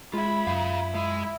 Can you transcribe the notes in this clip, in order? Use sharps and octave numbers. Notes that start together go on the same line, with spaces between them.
G#3 F4 E5 B5
F#2 G#4 F5
G#3 E4